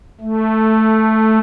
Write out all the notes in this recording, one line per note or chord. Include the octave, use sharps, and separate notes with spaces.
A3